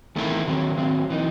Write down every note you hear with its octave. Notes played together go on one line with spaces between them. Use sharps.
E2 D#3 A3 C4 E4
D#3 F#3 C4
D#3 F#3 C4
E3 A3 D#4